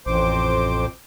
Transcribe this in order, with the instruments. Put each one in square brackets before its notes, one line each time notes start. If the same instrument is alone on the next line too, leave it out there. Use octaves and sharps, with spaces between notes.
[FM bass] A1 [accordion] F2 C5 D6